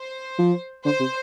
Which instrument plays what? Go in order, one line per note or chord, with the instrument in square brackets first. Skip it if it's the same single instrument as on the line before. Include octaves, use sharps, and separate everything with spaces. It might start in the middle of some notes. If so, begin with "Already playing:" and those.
Already playing: [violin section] C5
[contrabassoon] F3
[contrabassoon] D3 [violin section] C5
[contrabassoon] C3